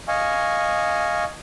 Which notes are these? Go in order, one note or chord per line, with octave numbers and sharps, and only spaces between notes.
D#5 F5 G#5 C#6